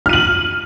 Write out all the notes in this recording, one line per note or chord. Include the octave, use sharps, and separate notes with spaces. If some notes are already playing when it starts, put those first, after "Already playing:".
F6 D#7 F#7